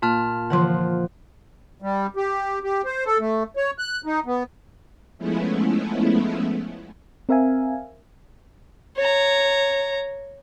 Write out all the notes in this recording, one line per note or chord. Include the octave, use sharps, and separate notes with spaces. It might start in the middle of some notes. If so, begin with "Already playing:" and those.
A#2 F4 A5 F6
D3 E3 F3 F#5 C6
G3
G4
G4
C5
A4
A3
C#5
F#6
D#4
B3
F3 G#3 A3 B3 C#4 E4
C4 A#4 E5 F5 G#5
C#5 A#5